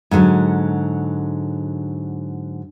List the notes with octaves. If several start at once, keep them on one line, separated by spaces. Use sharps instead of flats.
G#2 D3 E3 F#3